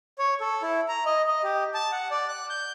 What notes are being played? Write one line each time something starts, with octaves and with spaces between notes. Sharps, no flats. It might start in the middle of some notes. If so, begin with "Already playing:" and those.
C#5
A4
E4
A#5
D#5
D#5
G4
A5
F#5
D5
F#6
G6